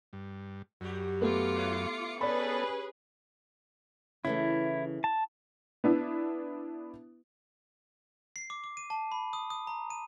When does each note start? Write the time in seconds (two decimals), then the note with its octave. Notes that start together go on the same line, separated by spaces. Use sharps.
0.13 G2
0.81 F#2 G3 F#4 G4
1.21 A3 B3 F4 D6 C#7
1.57 E4 B4 C#5
2.21 G2 B3 C#4 G#4 A4 B4 D5 B5
4.25 C#3 E3 A3 E4
5.04 A5
5.84 B3 D4 E4
8.36 C7
8.50 D6
8.64 D6
8.77 D#7
8.90 A5
9.12 B5
9.33 D#6
9.50 D#6
9.67 A#5
9.90 D#7